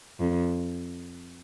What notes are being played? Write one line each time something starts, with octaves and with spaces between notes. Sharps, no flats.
F2